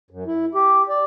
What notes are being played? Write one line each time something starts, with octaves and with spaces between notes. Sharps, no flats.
F#2
E4
G4
D5